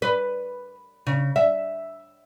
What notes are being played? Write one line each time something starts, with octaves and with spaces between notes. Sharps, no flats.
B4
C#3
E5